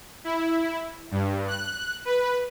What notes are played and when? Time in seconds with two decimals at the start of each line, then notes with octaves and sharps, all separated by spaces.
0.24 E4
1.11 G2
1.48 F#6
2.05 B4